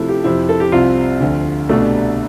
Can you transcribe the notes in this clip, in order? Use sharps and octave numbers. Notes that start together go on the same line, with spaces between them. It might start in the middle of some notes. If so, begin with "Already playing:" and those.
Already playing: C3 F3 A3 E4
G4
F2 C3 F3 C4 E4
A4
G4
C2 C3 F3 C4 F4
D2 D3 F3
C2 B2 G3 A3 D4